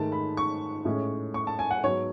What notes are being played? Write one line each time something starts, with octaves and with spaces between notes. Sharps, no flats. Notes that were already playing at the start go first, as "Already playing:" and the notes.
Already playing: G#2 D#3 A3 A5
B5
C#6
A2 G#3 C#4
C#6
A5
G#5
F#5
G#2 F#3 B3 C#5